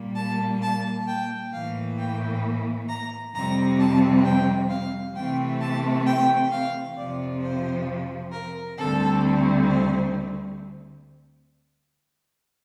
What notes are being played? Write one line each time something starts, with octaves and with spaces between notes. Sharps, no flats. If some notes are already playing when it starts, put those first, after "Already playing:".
Already playing: A#2 G3 A#3
A5
A5
G5
A2 E3 A#3 F5
G5
A#5
F2 C3 G3 C4 A#5
A5
G5
F5
C3 E3 A3 C4 G5
A5
G5
F5
F2 C3 F3 D5
C5
A#4
D2 D3 G3 C4 A4
C5